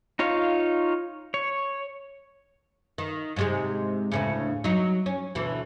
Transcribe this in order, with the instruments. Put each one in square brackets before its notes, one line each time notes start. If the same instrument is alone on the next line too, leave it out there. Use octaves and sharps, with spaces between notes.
[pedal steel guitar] D#4 F4 C#5 F5
C#5
[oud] D#3
G#2 C3 G#3
D2 A2 C#3
F#3 D#4
C#4
D2 B2 E3